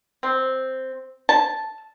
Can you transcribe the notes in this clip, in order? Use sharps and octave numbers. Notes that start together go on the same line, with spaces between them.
C4
A5